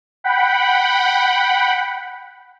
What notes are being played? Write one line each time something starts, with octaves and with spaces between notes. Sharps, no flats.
F#5 G5 B5